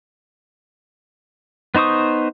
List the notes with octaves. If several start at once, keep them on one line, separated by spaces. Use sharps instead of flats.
B3 D#4 C5 C#6 D#6